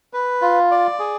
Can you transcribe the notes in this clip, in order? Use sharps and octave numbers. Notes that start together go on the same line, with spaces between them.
B4
F4
D5
G#4